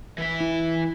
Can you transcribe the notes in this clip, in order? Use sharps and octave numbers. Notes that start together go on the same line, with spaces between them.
E3 E5
E4